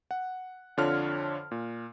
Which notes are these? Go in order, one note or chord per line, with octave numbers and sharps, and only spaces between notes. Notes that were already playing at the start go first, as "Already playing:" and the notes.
F#5
F2 D3 D4 F4 C#5 F6
A#2